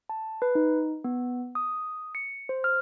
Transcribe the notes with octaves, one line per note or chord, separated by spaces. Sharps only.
A5
B4
D#4
B3
D#6
C#7
C5
F6